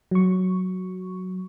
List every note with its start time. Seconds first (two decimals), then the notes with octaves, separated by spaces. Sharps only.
0.11 F#3 C#6